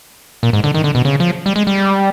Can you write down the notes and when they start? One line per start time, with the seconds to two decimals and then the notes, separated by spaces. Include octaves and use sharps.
0.43 A#2
0.53 G#2
0.64 D3
0.74 D#3
0.84 D3
0.95 B2
1.05 C#3
1.20 F3
1.46 G3
1.56 G#3
1.67 G3